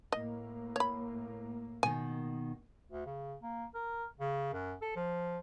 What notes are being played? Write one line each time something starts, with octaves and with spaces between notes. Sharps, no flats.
A2 A#3 D#5
C#5 B5
B2 D#3 G#5
D2
C#3
A#3
A#4
C#3
F#2
A4
F3